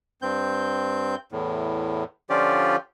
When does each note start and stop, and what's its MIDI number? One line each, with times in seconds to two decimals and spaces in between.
0.22 1.15 43
0.22 1.15 60
0.22 1.15 91
1.32 2.04 40
1.32 2.04 45
2.30 2.76 50
2.30 2.76 53
2.30 2.76 61
2.30 2.76 65
2.30 2.76 67
2.30 2.76 74